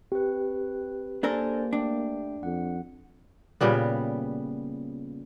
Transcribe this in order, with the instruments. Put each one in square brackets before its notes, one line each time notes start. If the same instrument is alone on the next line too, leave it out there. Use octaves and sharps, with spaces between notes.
[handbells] C4 B4 [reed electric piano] G4
[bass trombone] A#3 [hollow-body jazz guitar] D4 A4 A#4 [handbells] C5 D5 G#5
[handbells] A3 G5 [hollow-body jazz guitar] D4
[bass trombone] F2 [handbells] F#5
[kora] A#2 C#3 G3 B3